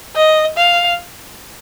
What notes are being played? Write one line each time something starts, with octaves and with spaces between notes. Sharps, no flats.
D#5
F5